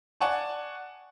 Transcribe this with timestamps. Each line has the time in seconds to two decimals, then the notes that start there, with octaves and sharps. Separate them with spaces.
0.21 D5 F#5 G#5 A5 C#6